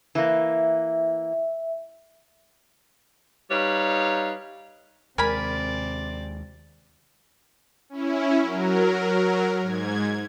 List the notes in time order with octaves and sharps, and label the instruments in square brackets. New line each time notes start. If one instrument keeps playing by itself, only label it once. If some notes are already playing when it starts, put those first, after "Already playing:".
[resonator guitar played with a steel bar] E3 A#3 [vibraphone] E5
[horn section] G3 D#4 B4 C#5 F5
[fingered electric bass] D#2 G#3 [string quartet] C3 C4 D5 [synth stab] A#4 [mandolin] G#5 B5
[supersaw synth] C#4 E4
F#3 A#4
G#2 G#6